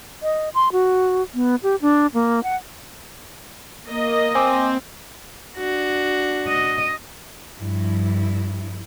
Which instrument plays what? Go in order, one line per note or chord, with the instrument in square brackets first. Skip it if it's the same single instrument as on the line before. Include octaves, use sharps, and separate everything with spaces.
[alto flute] D#5
C6
F#4
B3
G4
D4
A#3
F#5
[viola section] A#3 D#5
[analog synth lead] C4 [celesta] G#5 D6
[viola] D4 F#4
[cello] D#5
[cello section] G2 F3 E4